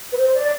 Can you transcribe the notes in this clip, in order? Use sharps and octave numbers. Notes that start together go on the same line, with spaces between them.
B4
C5
D5